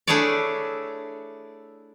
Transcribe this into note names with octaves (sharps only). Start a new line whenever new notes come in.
A3 D4 E4 G#4 C#5 D5